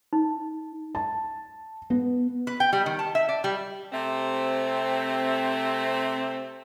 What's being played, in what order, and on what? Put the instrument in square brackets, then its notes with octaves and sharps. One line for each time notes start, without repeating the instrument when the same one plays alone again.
[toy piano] D#4
[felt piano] A5
B3
[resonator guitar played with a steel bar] B4
G5
G3
D#3
A5
E5
D5
G3
[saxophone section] C3 A3 C4